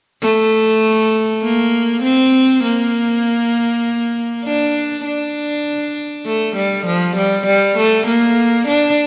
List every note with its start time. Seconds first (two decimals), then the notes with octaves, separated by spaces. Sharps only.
0.22 A3
1.42 A#3
2.03 C4
2.64 A#3
4.45 D4
5.05 D4
6.26 A3
6.56 G3
6.86 F3
7.17 G3
7.46 G3
7.77 A3
8.07 A#3
8.68 D4